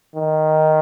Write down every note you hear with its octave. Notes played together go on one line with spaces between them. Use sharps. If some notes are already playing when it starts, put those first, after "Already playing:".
D#3